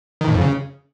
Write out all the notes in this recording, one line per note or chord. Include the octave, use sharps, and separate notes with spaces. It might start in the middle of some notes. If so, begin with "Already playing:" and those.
D#3
A2
F2
C#3